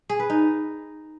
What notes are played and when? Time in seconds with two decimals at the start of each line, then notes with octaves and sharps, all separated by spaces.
0.10 G#4
0.20 B4
0.30 D#4